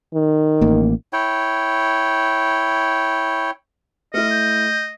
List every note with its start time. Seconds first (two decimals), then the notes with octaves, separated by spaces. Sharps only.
0.14 D#3
0.61 A1 A#3
1.13 E4 C#5 G5
4.14 A3 E4 D#5 F6
4.30 G6